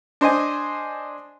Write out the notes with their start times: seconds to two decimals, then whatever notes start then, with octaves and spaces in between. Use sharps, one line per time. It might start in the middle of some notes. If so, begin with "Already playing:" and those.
0.21 D4 C5 D#5 G#5